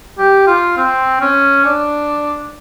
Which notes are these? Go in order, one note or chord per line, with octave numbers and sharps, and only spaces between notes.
G4
F4
C4
C#4
D4